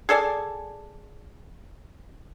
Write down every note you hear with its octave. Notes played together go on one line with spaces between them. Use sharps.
G#4 A4 D5 G#5